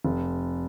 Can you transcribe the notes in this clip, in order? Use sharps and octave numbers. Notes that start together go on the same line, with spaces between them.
F1